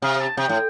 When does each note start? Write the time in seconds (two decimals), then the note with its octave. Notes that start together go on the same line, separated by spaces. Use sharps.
0.02 C3 F5
0.20 A5
0.37 C3 G5
0.49 A2